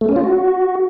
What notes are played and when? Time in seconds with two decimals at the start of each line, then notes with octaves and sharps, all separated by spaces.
0.01 A3
0.09 C#4
0.16 F4
0.24 F#4